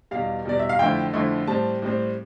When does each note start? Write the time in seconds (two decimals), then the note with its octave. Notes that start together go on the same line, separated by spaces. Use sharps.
0.11 E2 B2 G3 F5
0.45 E2 B2 G3 D5
0.59 E5
0.69 F5
0.79 F2 D3 F3 A3 E4 G5
1.13 F2 D3 F3 A3 E4
1.47 A2 G3 C4 A5
1.82 A2 G3 C4